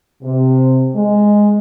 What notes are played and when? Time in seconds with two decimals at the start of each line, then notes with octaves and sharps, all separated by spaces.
0.23 C3
0.96 G#3